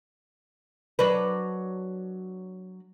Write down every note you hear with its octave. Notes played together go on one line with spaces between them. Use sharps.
F#3 D4 B4